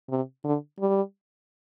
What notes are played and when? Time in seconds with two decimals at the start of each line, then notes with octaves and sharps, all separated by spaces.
0.09 C3
0.44 D3
0.80 G3